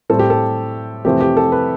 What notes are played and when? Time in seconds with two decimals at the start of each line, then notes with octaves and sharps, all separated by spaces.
0.10 A2 G3 C4 A4
0.19 G4
0.30 A4
1.05 F2 C3 E3 A3 C4 G4
1.21 G4
1.37 A4
1.52 B4